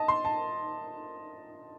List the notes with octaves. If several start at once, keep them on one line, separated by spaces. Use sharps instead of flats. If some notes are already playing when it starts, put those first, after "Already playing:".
Already playing: D#5 A5
C6
A5